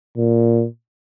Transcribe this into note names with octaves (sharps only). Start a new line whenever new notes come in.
A#2